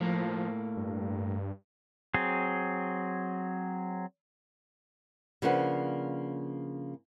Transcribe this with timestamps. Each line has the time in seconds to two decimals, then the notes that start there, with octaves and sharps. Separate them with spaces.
0.01 A2 F3 A#3
0.77 G2
2.14 F#3 C4 G#4
5.42 C#3 F3 A#3 D4 B4 F#5